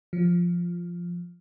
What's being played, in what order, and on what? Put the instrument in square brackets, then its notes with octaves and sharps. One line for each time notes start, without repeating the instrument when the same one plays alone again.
[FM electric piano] F3